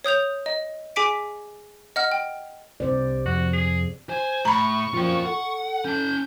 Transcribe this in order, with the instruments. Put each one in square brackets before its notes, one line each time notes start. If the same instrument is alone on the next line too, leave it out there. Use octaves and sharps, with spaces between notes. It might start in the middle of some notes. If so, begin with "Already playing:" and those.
[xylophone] C#5 D#6 G6 F7
D#5
G#4 G#5 D6 B6 D7
D#5 F#5 F6
G5
[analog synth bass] C2 [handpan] C3 C5 D5
[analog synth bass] F2 [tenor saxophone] F#4
[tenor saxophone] G#4
[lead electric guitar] C5 [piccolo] G#5
[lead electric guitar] A2 [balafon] A#5 B5 [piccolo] C#6
[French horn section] F#2 A#2 F3 [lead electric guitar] F4 G5
[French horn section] A4 [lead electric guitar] F#5
[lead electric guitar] C#4 A5 [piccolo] G6